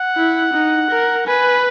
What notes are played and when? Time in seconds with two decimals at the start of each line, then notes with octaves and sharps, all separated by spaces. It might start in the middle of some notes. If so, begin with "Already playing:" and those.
Already playing: F#5
0.17 E4
0.53 D#4
0.90 A#4
1.27 B4 G#5